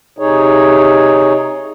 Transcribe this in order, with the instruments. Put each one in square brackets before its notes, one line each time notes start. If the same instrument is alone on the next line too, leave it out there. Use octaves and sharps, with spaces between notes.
[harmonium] C3 D#4 G#4 C#5